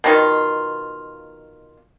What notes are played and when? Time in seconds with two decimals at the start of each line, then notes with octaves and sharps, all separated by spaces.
0.04 B2 D#3 F4